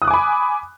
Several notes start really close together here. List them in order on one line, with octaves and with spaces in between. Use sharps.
D#6 F#6 D6 G#5 B5